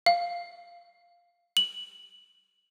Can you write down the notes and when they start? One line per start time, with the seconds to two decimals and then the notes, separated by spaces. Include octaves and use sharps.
0.06 F5
1.57 F#7